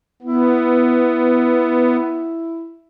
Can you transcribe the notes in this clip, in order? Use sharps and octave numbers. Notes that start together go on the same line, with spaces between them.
B3 E4